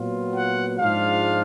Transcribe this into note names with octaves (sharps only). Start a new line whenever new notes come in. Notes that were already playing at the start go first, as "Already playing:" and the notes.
Already playing: A#2 F#3 B3 F4
F#5
G#2 F3 G#3 D4 F4 F5